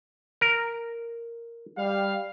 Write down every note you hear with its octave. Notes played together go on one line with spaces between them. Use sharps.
A#4
G3 F5